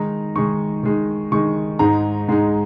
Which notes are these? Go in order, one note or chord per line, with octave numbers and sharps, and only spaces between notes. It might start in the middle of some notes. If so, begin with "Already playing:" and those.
Already playing: D#3 G#3 D#4 A#5
D#3 G#3 D#4 C#6
D#3 G#3 D#4
D#3 G#3 D#4 C#6
G#2 G#3 D#4 A#5
G#2 G#3 D#4